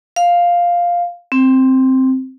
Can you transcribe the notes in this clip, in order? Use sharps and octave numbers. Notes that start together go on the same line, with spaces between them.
F5
C4